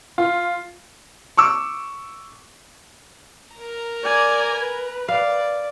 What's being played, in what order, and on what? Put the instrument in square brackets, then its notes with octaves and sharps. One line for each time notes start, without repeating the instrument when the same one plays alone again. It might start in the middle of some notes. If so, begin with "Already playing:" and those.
[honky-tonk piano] F4
[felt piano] C#6 D6 E6
[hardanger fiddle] A#4 A#5
[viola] D5 G#5
B4
[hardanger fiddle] D5 [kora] F5